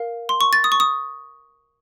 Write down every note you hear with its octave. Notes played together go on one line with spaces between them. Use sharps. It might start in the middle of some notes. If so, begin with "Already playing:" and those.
Already playing: A#4 F5
C6
C#6
A6
D#6
C#6
D#6